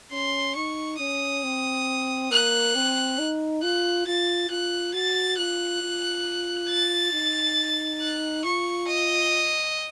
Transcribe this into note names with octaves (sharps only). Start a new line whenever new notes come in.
C#4 C6
D#4 C#6
C#4 D#6
C4
A#3 F#6
C4
D#4
F4 F#6
F4 A6
F4 F#6
F#4 A6
F4 F#6
F4
A6
D#4
F#6
F4 C#6
D#5